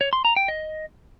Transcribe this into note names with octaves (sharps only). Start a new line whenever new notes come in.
C#5
C6
A#5
G5
D#5